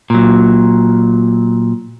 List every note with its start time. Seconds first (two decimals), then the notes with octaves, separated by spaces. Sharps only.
0.10 A#2 F#3